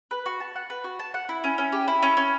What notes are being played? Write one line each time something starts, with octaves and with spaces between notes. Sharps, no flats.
B4
F#4
A5
F#5
B4
F#4
A5
F#5
E4
C#4
C#4
G4
E4
C#4
C#4